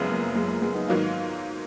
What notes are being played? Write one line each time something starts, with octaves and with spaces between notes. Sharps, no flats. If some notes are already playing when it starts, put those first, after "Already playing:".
Already playing: F#1 F#2 C#3 F3 G#3 B3
A#3
G#3
A#3
G#3 B3
B3 D#4
G#2 D#3 F#3 A#3 F4